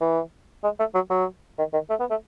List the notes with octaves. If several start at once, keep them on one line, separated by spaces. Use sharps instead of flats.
E3
G#3
A3
F#3
F#3
D#3
D#3
A3
B3
A3